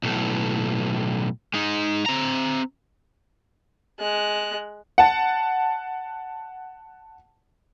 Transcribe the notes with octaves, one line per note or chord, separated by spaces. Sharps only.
B1 A2
G#3 D#4
C4 A#5
G#3 F#6
F#5 A5